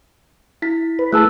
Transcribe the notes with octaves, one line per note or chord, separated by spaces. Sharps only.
E4 B6
B4
A3 E4 G#4 A5 E6 F#6